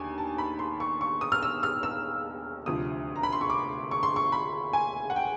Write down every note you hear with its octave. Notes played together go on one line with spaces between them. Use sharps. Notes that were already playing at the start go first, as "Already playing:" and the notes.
Already playing: D#2 D3 G#5
A5
B5
C6
C#6
C#6
D#6
F6
E6
F6
E6
D2 C3 F3 D#6
A#5
B5
C6
C#6
D6
C#6
C6
C#6
B5
G#5
F#5
G5